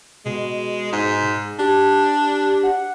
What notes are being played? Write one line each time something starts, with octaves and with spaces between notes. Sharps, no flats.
B2 G#3
G#2
D4 G4
F#5